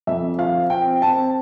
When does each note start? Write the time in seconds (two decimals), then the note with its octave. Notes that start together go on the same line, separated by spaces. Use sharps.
0.07 F2 E5
0.38 F3 F5
0.70 C4 G5
1.02 C4 A5